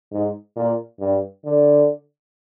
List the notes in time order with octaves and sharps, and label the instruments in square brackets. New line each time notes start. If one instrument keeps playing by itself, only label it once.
[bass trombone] G#2
A#2
G2
D3